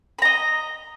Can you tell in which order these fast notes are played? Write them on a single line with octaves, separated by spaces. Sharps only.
B5 A#5 D#5